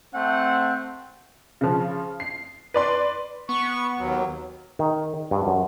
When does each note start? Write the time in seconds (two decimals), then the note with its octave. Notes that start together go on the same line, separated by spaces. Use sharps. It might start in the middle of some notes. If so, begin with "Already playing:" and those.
0.14 A3 C4 F#5
1.61 C#3 F3
2.20 C7
2.74 B4 D5 C6
3.49 B3 C#6
3.98 D#2 F#3
4.79 D#3
5.31 G2
5.47 F#2